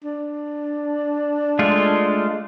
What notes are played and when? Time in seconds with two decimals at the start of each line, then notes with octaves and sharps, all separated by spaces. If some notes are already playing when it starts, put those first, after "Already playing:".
0.04 D4
1.59 G#3 A3 F4